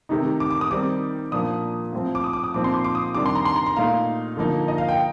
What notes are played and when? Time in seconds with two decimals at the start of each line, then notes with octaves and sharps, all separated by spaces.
0.09 C3 D#3 A3 D#4
0.40 D6
0.51 D6
0.61 D#6
0.70 D#3 G3 C4 D#4 D6
1.32 A#2 F3 A#3 D4 D#6
1.92 A2 F3 C4
2.15 D6
2.24 D#6
2.33 D6
2.44 D#6
2.54 A#2 F3 C4 D#4 D6
2.64 C6
2.74 D6
2.84 D6
2.95 D#6
3.14 C3 D#3 G3 D4 D6
3.26 C6
3.35 A#5
3.45 C6
3.56 A#5
3.66 A#5
3.76 A#2 A3 D#4 F5
4.37 D3 F3 A#3 D#4
4.68 D#5
4.78 F5
4.89 G5